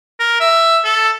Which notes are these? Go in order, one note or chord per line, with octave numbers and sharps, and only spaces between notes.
A#4
E5
A4